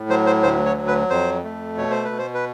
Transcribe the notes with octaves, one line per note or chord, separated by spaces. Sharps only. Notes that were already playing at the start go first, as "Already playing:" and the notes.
Already playing: A2
F#3 C5
C5
D2 C5
C#5
F#3
B4
F2 C5
A3
B2 C#5
C5
B4
B2
C5
B4